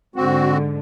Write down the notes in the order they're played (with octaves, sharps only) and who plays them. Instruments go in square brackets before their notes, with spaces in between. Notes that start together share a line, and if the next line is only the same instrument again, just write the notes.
[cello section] G#2 D3 [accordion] C4 F#4